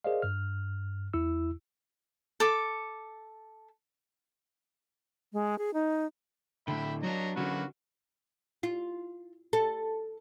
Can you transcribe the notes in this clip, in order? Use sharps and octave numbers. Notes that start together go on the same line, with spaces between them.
G#4 A#4 C5 D5 D#5 F5
G2 F6
E2 E4 E6
A4 D6
G#3
G#4
D#4
A2 D3 E5 G5 B5
F#3 D4 C#5 D#5 A#5
D3 F#3 A#3 C#4 F#4 B4
F4
A4